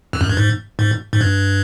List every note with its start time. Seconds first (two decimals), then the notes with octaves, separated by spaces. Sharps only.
0.13 F2
0.21 F#2
0.29 G2
0.37 G#2
0.79 G#2
1.13 G#2
1.21 G2